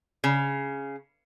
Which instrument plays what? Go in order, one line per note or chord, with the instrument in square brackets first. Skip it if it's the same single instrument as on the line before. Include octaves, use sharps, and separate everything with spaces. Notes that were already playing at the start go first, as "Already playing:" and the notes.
[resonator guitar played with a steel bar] C#3